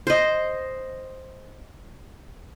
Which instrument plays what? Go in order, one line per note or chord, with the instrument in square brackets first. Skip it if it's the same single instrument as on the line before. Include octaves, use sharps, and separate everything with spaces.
[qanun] C5 D#5